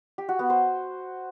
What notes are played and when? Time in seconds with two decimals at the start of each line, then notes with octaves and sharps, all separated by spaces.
0.18 G4
0.29 F#4
0.39 B3
0.50 C5